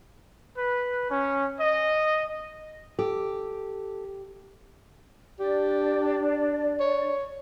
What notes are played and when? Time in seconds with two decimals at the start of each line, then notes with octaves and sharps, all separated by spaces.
0.58 B4
1.10 C#4
1.59 D#5
2.99 G4 A4
5.40 D4 G4 D5
6.80 C#5